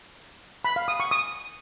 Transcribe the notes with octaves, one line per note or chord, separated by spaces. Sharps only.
B5
F5
D#6
C#6
D#6